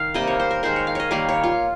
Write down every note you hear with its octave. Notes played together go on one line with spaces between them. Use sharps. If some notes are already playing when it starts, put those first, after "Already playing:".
Already playing: D#3 F5
C3 G3 A#3 D#5
C#5
C5
A#4
D#3 G#3 C5
C#5
F5
C#5 D#5
D#3 G3 A#3 F5
C#5
F4